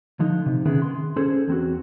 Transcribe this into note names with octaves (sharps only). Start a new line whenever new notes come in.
D3 F3 D#4
C3
D3 D#3 B3 C#4 E4 G#4
C6
C#4 G#4 A4 C5
E2 C4 F#4